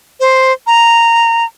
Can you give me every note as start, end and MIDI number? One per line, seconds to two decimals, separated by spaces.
0.20 0.52 72
0.67 1.44 82